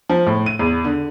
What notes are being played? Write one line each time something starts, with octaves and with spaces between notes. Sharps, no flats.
F3
A2
D#7
E2
D3